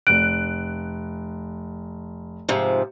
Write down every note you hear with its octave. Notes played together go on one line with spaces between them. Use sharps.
F1 F#6 D7
G#2 C3 F3